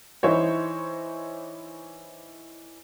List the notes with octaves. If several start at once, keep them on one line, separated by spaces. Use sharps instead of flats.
E3 D#4 E4 C5 C#5